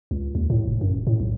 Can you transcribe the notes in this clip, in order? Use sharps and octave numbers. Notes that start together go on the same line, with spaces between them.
C#2
D#2
A2
F1
F#2
D1
A2
B1